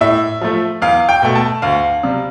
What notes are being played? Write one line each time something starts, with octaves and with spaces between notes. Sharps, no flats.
A2 E5
F3 A3
E2 F5
G5
B2 A3
A5
D2 F5
C3 G3